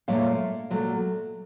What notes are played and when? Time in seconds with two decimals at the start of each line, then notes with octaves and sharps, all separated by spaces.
0.08 A#2 F#3 A3 F5
0.70 A#2 F#3 A3